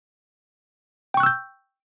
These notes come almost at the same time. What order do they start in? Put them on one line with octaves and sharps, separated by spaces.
G5 C#6 F#6 E6 G6